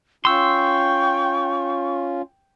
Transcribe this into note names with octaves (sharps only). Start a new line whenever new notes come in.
C#4 F4 G5 C6 C#6 E6